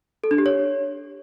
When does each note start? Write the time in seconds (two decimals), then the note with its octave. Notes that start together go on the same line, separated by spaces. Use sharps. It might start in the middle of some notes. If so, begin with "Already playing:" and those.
0.24 A4
0.31 D4
0.38 G4
0.46 C#5